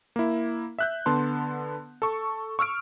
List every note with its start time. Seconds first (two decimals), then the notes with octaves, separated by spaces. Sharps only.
0.16 A#3 E4
0.79 E5 F#6 G6
1.06 D3 B3 A5 C6
2.02 A4 C#6
2.59 C#6 E6 F6 D7